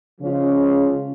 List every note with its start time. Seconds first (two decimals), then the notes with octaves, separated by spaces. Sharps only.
0.19 C#3 F3 G#3 C#4 F4